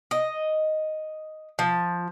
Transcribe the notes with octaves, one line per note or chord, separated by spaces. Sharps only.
D#5
F3